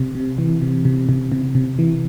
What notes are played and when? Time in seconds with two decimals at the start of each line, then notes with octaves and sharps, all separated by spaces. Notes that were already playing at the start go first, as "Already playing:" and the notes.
Already playing: C3
0.15 C3
0.38 E3
0.62 C3
0.85 C3
1.09 C3
1.32 C3
1.55 C3
1.79 E3